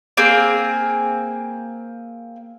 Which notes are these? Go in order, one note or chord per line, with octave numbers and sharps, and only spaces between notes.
A#3 C4 G#4